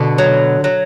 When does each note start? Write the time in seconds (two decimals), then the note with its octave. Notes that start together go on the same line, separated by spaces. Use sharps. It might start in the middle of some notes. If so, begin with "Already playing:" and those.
Already playing: B2 D3
0.18 F#3
0.64 F#3